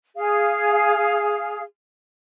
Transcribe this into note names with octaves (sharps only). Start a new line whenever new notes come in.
G#4 F5